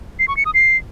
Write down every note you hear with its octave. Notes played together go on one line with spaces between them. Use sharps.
C7
C#6
C#7
D#6
C7